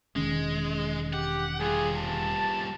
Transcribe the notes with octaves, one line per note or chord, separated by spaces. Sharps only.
E1 D#3 G#3 C#4
G4 F#5
G3 F4 G#4
A5